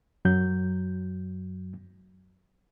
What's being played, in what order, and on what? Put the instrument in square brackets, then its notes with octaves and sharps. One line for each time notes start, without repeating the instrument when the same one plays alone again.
[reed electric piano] F#2 F#3 G6